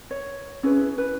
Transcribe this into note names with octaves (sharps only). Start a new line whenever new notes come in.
C#5
C#4 E4 G#4 B4
B4